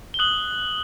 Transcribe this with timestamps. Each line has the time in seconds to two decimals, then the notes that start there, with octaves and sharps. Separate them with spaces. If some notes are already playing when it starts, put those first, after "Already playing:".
0.14 G7
0.19 D#6 F#6 F#7